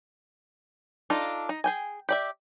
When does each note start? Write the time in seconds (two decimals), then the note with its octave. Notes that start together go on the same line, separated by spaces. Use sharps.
1.10 D4 D#4 F4 A4
1.49 D#4
1.64 G#4 G5 G#5
2.09 G4 D5 E5